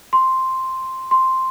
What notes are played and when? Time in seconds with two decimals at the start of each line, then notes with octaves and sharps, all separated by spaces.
0.13 C6
1.11 C6